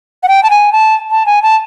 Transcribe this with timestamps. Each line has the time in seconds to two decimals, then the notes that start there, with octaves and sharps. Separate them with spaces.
0.23 F#5
0.28 G5
0.43 A5
0.50 G#5
0.72 A5
1.10 A5
1.26 G#5
1.42 A5